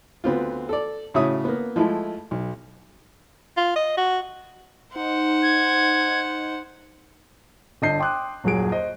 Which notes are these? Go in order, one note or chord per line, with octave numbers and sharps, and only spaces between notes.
D2 B3 C4 F4
A4 D5
A2 C#3 F#4 C#5 E5 D#6
A#3 B3
F3 G#3 A3 E4
B1
F4
D#5
F#4
D#4 C5 F#5
G#6
G1 D3 D#5 A5 G6 C7
G5 C6 D6 D#6 F#6
D#1 F#2 F#3 G#4 D7
C5 D#5